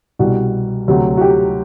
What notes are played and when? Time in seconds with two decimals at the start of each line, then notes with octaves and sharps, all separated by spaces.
0.19 C2 B2 G3 F#4
0.88 D2 C3 F#3
1.17 F#4
1.21 G4